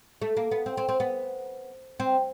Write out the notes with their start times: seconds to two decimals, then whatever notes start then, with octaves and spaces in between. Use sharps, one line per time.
0.22 A3
0.37 A#3
0.51 B3
0.66 C4
0.77 C4
0.89 C4
1.00 B3
2.00 C4